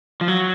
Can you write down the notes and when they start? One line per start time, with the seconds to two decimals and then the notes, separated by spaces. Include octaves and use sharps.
0.21 F3
0.28 F#3